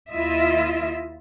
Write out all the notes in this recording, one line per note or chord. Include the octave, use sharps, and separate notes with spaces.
D#2 E4 F4 D#5 E5